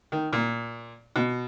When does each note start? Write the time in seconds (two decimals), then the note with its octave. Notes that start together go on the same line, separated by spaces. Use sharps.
0.12 D#3
0.33 A#2
1.16 B2